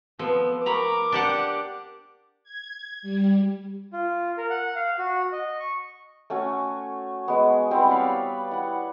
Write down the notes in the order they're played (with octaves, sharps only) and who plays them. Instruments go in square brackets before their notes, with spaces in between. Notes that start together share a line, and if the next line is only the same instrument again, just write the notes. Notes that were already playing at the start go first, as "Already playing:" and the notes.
[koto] F3 [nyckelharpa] B3 [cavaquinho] A4
[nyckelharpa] A#4 [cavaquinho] A#5 B5 C#6 [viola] D6
[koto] D4 G4 F#5
[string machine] G#6
G3
[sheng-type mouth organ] F4
A#4
F#5
F5
F#4
D#5
C#6
[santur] A3 C#4 F#4 G#5
G#3 B3
G3 B3 C4 E4
C#5 D5 F5 B5
E4 F#5